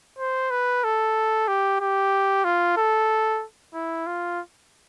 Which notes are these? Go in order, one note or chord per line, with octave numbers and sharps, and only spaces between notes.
C5
B4
A4
G4
G4
F4
A4
E4
F4